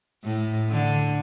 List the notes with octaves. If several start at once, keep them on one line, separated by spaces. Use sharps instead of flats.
A2
D3